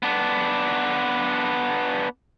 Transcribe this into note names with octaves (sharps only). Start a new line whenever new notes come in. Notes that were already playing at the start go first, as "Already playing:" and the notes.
B3 D4